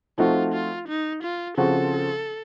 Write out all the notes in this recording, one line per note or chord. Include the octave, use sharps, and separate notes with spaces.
F3 A3 C4 D#4 F4 F#4
F4
D#4
F4
C#3 F3 C4 F#4 A4